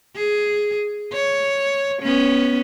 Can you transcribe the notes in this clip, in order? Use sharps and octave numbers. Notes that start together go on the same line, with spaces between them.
G#4
C#5
B3 C#4